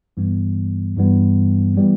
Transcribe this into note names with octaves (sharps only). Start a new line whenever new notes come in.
G2 E3 G3 B3
G2 E3 G3 B3
E3 G3 B3